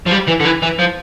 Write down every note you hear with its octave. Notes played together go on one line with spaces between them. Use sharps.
F3
G3
E3
D3
E3
E3
F3